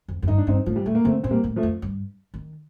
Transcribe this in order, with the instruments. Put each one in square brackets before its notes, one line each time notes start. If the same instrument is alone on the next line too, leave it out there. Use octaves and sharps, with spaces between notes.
[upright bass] F2
F2
[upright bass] G2 [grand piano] D#4
[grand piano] D4
[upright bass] G2 [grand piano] C4 D#4
[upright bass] A2 [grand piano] F3
[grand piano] G3
[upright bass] A#2 [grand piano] A3
[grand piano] A#3
[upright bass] D3 [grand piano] A3 C4
[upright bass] A#2 [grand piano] C4
[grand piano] G3 A#3
[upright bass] A2
[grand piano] F3 A3
[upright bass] F2
G2
D#3